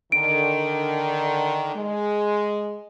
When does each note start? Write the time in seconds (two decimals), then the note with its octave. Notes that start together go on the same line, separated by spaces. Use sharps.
0.12 D3 D#3 D7
1.76 G#3